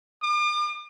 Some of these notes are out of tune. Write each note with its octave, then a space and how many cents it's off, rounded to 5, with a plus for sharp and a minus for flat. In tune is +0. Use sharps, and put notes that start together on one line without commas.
D6 +45